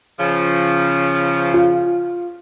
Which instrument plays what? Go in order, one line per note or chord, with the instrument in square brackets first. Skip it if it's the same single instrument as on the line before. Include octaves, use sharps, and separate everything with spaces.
[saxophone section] C#3 F3
[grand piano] F4